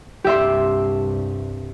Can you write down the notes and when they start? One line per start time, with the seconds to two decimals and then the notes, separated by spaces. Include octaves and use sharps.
0.24 C2 G2 G4 E5 C6